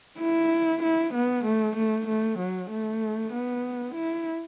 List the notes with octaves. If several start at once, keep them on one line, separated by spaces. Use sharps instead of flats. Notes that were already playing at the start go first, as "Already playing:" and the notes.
E4
E4
B3
A3
A3
A3
F#3
A3
B3
E4